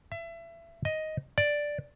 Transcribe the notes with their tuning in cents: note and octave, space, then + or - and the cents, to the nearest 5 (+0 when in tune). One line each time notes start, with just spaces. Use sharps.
E5 +25
D#5 +5
D5 +0